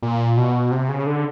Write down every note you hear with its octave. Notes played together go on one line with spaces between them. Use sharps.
A#2
B2
C3
C#3
D3